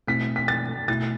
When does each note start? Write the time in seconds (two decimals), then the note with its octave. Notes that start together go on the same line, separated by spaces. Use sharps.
0.08 B2 A3 C4 E4 B6
0.36 B6
0.48 A6
0.88 B2 A3 E4 A6